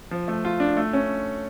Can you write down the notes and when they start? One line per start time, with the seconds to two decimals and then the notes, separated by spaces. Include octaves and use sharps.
0.11 F3
0.28 A3
0.45 F4
0.60 D4
0.77 A3
0.93 C#4